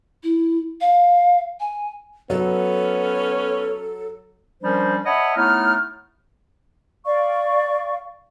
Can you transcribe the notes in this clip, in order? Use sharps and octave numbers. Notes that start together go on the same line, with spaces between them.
E4
F5
G#5
F#3 B3 C#4 A4
F3 G3 C#4 D4 A#4 C5
C#5 D#5 E5 F#5 A5 B5
A3 B3 D#4 E4 C#5 F6
D5 F5 C#6